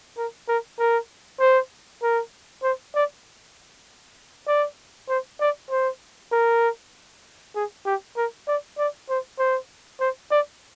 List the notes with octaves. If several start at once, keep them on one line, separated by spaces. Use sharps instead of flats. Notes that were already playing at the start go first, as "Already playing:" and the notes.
A#4
A#4
A#4
C5
A#4
C5
D5
D5
C5
D5
C5
A#4
G#4
G4
A#4
D5
D5
C5
C5
C5
D5